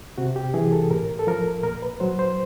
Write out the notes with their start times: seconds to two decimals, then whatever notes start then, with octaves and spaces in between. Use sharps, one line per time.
0.18 C3 F#4
0.36 G4
0.54 E3 G#4
0.72 A4
0.91 A2 A#4
1.19 A4
1.27 F3 A#4
1.63 A#2 A#4
1.82 B4
2.00 F#3 C5
2.19 C5